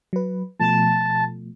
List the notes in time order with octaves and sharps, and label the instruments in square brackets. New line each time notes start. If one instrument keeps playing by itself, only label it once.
[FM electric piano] F#3 B4
[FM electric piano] B2 F3 A3 [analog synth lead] A5